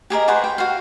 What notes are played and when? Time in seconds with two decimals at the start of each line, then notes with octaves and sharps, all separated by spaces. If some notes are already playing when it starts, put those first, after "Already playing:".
0.10 G4 G#4 A#4 D#5
0.28 F#4 G#4 B4 C5
0.44 G5
0.58 F#4 F5